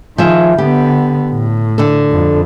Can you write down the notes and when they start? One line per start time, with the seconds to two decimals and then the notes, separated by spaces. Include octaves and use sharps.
0.18 D#3 F3 G#4 E5
0.58 D3 B3 G4
1.31 A2
1.78 D3 A4
2.12 F2